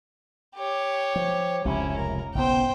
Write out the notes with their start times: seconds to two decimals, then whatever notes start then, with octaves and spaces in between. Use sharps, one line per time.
0.56 G4 C#5
1.16 F3
1.65 F1 C#2 C3 C#4 E4
1.96 A#4
2.35 F#1 B1 B3 C5 G5